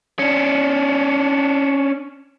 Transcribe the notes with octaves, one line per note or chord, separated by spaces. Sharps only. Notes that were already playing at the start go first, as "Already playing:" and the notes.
C#4 D4